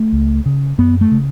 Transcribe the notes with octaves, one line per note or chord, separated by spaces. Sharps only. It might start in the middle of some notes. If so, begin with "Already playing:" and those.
Already playing: A3
C#2
C#3
F#2 B3
A3
C#3